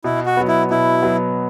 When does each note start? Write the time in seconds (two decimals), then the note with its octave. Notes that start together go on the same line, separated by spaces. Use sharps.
0.04 B2 E4
0.26 F#4
0.37 F#3 B3
0.48 E4
0.70 B2 E4
1.02 F#3 B3